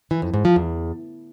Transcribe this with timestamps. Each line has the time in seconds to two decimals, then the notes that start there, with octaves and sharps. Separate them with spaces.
0.11 E3
0.22 F2
0.34 G#2
0.45 F3
0.56 E2